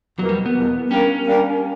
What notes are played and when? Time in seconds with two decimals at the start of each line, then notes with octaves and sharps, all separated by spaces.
0.19 E2 B2 F#3 A#3
0.29 G3
0.46 B3
0.55 E2 B2 A#3
0.91 G3 A#3 C#4 D4 A#4
1.27 G3 A#3 D4 A#4